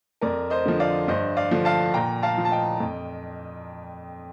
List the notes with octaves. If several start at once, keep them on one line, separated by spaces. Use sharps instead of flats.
F2 A#4 D5
C5 D#5
D3 F3
D5 F5
G2 C5 D#5
D5 F5
D3 F3
F5 A5
A#2 G5 A#5
F5 A5
F3
A5
D#5 G5
F2